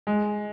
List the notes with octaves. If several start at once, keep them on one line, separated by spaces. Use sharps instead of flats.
G#3